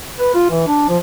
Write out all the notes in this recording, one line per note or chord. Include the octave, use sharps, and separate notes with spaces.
B4
F4
E3
D4
F3